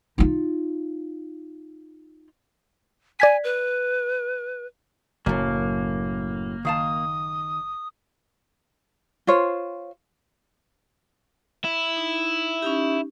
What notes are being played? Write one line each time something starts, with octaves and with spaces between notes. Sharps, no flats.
D#4 F4
D5 G#5 G#6 B6
B4
F#1 F#2 A2 A#3
D#3 F5 A5 D#6
F4 C5 C#5
E4
D#4
C#4 D#4 G4